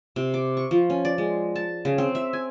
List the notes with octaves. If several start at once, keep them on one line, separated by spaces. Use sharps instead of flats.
C3
D6
C#6
F3
C#4
D5
G#3
A5
C#3
C4
E5
G#5